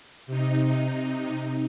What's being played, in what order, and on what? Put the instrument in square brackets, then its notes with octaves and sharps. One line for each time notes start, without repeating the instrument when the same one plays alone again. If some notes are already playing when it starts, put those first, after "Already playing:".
[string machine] C3 D#4